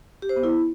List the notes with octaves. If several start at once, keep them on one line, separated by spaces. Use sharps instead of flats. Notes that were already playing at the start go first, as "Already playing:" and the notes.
G4
C5
B3
E4